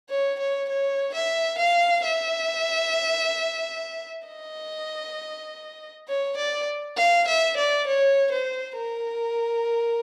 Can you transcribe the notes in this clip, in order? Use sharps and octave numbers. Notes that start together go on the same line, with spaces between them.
C#5
C#5
C#5
E5
F5
E5
D#5
C#5
D5
F5
E5
D5
C#5
C5
A#4